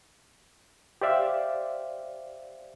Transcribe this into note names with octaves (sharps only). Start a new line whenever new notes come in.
G4 C5 D5 E5 F5